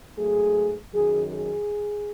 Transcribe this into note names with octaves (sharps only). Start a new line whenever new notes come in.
G#2 F#3 A3 G#4
F#2 D#3 F#3 G#4
G#4